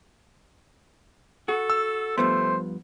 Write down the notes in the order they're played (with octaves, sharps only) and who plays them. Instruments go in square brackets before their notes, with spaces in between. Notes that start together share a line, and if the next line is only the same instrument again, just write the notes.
[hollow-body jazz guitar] F#4 [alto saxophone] A4
[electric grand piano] E6
[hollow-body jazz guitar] G2 F3 B3 [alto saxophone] A3 [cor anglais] C5